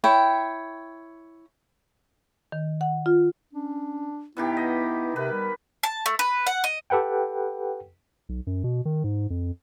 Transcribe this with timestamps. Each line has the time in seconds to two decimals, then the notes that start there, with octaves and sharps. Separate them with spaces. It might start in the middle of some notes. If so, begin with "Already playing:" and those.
0.04 E4 C#5 G5
2.52 D#3
2.81 F#5
3.06 F4
3.53 C#4 D4
4.37 B2 D#3 B3 E4 G4
4.57 D#5
5.16 C3 A#4 B4
5.33 G3
5.83 A5
6.06 A3
6.19 B4
6.47 F#5
6.64 D#5
6.90 G4 A4 B4 F#5 G5
8.29 B1
8.47 F#2
8.64 B2
8.85 D#3
9.04 G#2
9.30 F2